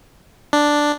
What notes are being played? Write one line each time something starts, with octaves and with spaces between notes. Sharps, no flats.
D4